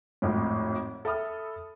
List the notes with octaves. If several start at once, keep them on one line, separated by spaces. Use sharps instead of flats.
G#1 F2 A2
A4 E5 B5 D#6 F6